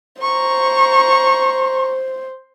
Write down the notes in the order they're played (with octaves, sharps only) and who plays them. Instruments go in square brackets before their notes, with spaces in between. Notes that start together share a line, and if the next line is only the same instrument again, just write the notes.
[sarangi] C5 [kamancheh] A#5 C#6